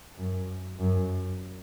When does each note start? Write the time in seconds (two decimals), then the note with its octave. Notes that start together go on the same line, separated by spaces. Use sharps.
0.17 F#2
0.79 F#2